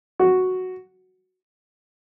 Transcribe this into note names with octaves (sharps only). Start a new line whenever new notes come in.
F#4